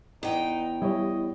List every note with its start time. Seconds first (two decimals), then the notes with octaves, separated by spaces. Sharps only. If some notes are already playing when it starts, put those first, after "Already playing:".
0.23 E2 D#4 G5
0.82 G3 E4 C#5 D#5